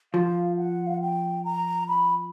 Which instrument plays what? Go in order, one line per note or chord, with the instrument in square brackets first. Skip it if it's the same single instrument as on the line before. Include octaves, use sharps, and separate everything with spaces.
[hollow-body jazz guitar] F3 [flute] F5
[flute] F#5
F5
F#5
G5
A#5
B5